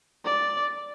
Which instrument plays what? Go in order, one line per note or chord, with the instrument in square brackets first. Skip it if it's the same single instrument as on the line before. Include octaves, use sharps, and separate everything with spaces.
[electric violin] D5